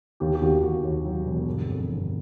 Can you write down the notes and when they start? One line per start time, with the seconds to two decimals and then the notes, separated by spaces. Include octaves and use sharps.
0.20 D#2 G4
0.35 G4
0.41 D#2 F#4
0.62 D#2 F#4
0.83 D#2
1.05 F#3
1.25 E1
1.46 G1
1.67 F2
1.88 G1